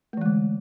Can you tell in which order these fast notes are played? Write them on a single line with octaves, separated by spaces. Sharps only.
A3 E3 G#3 D3